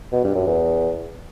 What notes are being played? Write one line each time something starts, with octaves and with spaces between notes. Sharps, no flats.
B2
G2
F#2
E2